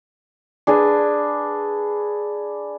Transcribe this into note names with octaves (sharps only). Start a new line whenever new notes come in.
D4 G#4 B4 D5